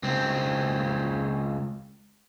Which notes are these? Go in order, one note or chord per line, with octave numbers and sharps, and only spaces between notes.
C#2 C4